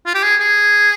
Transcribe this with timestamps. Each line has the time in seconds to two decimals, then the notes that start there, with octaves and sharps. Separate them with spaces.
0.06 F4
0.15 G4
0.24 G#4
0.40 G#4